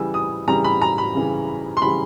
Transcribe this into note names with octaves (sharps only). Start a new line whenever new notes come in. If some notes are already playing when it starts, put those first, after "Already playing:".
Already playing: C#3 E3 G3 E6
D#6
C#3 E3 G3 A#5
B5
A#5
B5
C#3 E3 G3
C6
C#3 E3 G3 B5